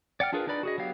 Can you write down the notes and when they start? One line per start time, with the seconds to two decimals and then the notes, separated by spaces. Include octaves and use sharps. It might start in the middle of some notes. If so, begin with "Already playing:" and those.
0.20 D5 F#5 G5 F6
0.32 D4 F4 G#4 A#4 B4
0.47 D4 D#4 B4 D5 B5
0.63 F#4 G#4 D#5
0.78 F#3 B3 G4 F5